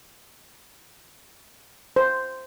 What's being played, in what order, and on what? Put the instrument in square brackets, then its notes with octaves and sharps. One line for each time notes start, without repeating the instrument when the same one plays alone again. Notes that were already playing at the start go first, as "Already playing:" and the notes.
[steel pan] C5